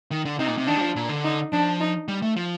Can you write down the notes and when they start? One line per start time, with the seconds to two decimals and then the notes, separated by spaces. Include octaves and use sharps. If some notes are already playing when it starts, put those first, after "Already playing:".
0.11 D#3
0.25 D3
0.39 C3 D#4
0.48 A#2
0.58 C3
0.67 D#3 D4
0.77 G3
0.81 F3
0.96 A#2
1.09 D3
1.24 D#4
1.52 F3 D4
1.80 D#4
2.08 G3
2.22 A3
2.36 F3